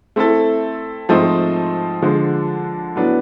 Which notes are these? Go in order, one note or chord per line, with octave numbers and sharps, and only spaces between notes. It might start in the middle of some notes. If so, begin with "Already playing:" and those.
A3 C4 E4 A4
G#2 F3 A3 C4 D#4
D3 F3 G#3
A2 F#3 B3 D4